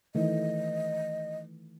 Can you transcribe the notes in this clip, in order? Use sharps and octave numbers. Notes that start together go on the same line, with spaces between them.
D#3 E3 A3 D#5